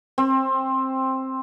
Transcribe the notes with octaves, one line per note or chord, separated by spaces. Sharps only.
C4